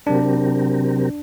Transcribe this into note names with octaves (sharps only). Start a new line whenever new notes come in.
C3 F#3 C4 D4 G4 A#4